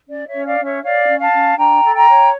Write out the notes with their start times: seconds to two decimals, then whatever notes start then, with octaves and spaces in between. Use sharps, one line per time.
0.09 C#4 D5
0.27 C#5 E5
0.34 C#4
0.46 D5 F5
0.59 C#4
0.64 C#5 E5
0.82 C#5 D5 F5
1.08 C#4
1.20 F5 A5
1.32 C#4
1.57 D4 G5 A#5
1.83 A4
1.94 G5 A#5
2.07 C#5